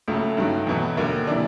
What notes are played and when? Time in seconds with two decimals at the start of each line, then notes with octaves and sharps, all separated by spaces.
0.08 C#2 C#3 F#3 A3
0.37 G2 D#3 F#3
0.67 E2 B2 F#3
0.97 D#2 D3 F#3 A#3
1.27 C3 E3 D4